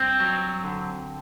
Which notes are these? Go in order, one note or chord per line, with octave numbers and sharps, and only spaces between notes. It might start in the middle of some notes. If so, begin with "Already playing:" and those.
Already playing: G2 C4
F#3
D3